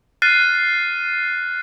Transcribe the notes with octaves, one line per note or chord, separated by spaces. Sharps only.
F6 F#6 A6 C7 D#7